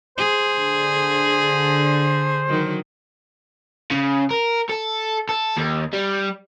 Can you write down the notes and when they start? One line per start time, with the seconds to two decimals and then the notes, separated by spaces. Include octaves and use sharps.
0.18 G#4 C5
0.56 D3
2.48 D#3 F#3
3.91 C#3
4.31 A#4
4.69 A4
5.29 A4
5.57 D#2
5.93 G3